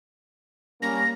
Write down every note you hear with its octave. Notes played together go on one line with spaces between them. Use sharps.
G3 A#3 C#4 A#6